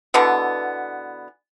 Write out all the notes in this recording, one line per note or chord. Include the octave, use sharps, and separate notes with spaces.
B2 D3 E3 B3